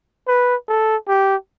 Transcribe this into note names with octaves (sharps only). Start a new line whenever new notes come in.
B4
A4
G4